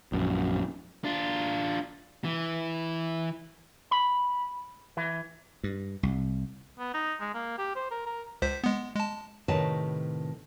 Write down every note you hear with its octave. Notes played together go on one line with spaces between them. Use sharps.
A#1 F#2
D4 F4
E3
B5
E3
G2
C2
B3
D#4
G#3
A#3
G4
C5
A#4
A#4
C#2 C5 B6
G#3 B3
G#3 A5
A2 C3 D#3 B4 C#5 A5